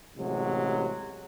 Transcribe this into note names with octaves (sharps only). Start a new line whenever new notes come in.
A1 C3 F#3 G#3